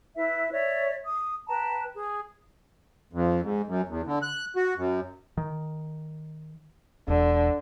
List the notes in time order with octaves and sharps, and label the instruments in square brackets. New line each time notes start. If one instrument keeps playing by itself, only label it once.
[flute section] E4 B4 E5
C#5 D5 E5
D#6
B4 G5 A5 A#5
G#4
[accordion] F2
G#2
F#2
E2
D3
F#6
F#4
F#2
[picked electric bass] D#3
[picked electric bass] E1 [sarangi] D3